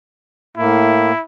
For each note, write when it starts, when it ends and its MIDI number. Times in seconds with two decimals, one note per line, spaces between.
0.57 1.12 45
0.57 1.12 58
0.57 1.22 64